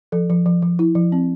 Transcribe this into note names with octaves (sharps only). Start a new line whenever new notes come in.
F3 A4
F3
F3
F3
E4
F3
C4